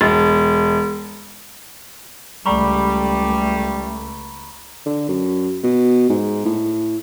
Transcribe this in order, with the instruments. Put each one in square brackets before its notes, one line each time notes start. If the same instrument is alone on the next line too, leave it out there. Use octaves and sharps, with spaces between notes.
[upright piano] E1
[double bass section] C#2 A3 [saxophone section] G3 [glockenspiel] A#5 B5 C#6
[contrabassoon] D3
F#2
B2
G#2
A2